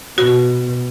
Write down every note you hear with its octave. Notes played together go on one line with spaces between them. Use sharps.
B2 F#4